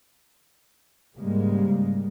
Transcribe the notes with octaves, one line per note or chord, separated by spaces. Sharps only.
G#2 C#3 G3 G#3 A#3